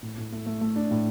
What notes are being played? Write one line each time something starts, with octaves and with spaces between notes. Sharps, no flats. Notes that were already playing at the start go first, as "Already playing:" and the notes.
A2
A2
A3
A3
A3
D4
A2